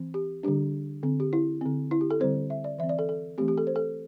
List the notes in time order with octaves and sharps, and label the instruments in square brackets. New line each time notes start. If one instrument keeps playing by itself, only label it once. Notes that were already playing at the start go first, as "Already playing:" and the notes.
Already playing: [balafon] E3 C4
G4
D3 G3 D4 G4
D3 C4
G4
E4
D3 C4
E4
G4
A4
D3 G3 C4 C5
E5
D5
E3 C4 E5
D5
A4
A4
E3 A3 C4 G4
G4
A4
C5
A4